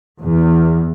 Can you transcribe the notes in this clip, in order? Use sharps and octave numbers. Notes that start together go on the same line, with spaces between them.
E2